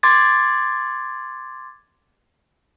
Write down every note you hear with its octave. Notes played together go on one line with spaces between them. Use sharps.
C6 D6 G#6 A6